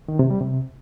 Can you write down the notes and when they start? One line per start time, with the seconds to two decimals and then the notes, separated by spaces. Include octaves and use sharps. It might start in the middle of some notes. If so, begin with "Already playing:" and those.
0.08 D#3
0.19 C3
0.30 G3
0.41 C3